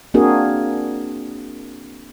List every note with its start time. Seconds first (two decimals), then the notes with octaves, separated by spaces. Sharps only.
0.14 A#3 C4 D4 F#4 G#4 A#4